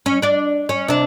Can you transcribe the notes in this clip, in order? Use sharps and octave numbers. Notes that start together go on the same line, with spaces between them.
C#4
D4 D5
C#4
C3 D4